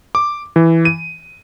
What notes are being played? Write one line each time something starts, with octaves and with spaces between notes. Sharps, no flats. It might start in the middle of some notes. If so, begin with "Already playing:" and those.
D6
E3
D#7